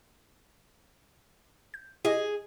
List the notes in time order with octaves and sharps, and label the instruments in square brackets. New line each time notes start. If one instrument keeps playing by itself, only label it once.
[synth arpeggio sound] G6
[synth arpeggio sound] E4 G4 D#5 [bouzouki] G#4